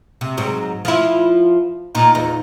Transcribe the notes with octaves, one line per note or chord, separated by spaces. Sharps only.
C3
G#2 F#3
F3 E4
A#2 D#4
E2 D#4